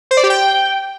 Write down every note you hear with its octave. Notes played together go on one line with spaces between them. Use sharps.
C5
D5
G4
G5